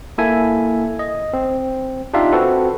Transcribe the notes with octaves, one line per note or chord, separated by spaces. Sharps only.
A#3 E4 A4 E5 G#5
D#5
C4
D4 D#4 F4 G4 E5 F5
C4 F#4 A4 B4